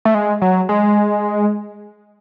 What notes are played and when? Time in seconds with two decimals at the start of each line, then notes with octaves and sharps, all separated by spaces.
0.05 A3
0.15 G#3
0.42 F#3
0.69 G#3